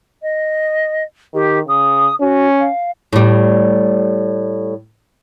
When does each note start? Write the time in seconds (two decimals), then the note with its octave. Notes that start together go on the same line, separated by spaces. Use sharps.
0.22 D#5
1.34 D#3 G4
1.68 C#3 D#6
2.20 C#4 F#4
2.59 F5
3.13 A2 G3